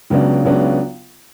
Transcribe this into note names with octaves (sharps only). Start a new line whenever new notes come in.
C#2 C#3 F#3 B3 D4
C#2 C#3 F#3 B3 D4